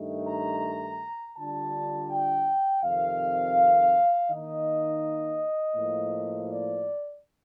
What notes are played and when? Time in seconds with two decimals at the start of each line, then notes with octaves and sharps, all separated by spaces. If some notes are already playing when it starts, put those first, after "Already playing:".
Already playing: G2 D#3 A3 D#4
0.28 A#5
1.37 D3 G3 D4 F4 A5
2.11 G5
2.84 F2 C3 D#3 F5
4.29 D#3 A#3 D#4 D#5
5.75 A2 F3 A#3
6.49 D5